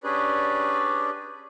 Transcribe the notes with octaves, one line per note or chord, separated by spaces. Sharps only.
C#4 D4 G4 G#4 B4 D5